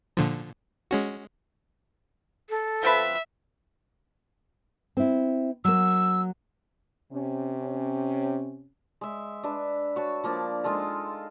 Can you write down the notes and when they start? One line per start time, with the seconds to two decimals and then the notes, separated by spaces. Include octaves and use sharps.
0.17 A#2 D3 F3
0.91 G#3 C#4 F#4
2.50 A4
2.83 F3 C4 B4 E5
4.97 C4 E4
5.65 F#3 A#3 E6
7.13 C3 C#4
9.01 G#3 E5
9.43 D4 B4 E5
9.96 F#4 C#5 A5
10.24 F3 A#3 D4 D5
10.64 G#3 D#4 F4 A4